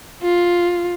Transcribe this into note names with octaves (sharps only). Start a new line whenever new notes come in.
F4